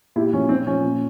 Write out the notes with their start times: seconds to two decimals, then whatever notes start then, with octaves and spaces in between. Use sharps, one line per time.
0.16 A#2 E4 G4
0.33 F3 C#4
0.49 A#2 C4
0.66 F3 C#4
0.83 A#2